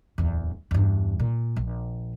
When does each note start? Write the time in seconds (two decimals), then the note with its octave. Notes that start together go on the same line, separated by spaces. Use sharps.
0.18 D1 E2
0.71 E2 G2
1.20 A#2
1.56 A#1